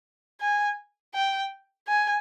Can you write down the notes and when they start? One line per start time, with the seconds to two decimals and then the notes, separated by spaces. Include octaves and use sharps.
0.41 G#5
1.15 G5
1.88 G#5